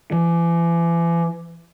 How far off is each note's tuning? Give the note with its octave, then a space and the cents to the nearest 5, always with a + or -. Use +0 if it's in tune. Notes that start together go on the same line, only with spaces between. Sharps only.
E3 +40